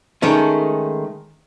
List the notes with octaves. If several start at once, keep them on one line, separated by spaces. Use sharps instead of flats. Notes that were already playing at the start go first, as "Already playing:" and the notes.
D#3 G#3 A3 C#4